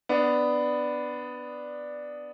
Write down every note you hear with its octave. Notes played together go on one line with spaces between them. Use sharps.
B3 D4